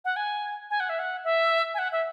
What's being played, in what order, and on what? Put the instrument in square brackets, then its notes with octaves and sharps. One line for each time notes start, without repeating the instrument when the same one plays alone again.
[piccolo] F#5
G#5
G#5
F#5
E5
F#5
E5
G#5
F#5
E5